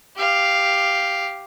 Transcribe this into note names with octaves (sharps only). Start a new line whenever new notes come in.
G4 F5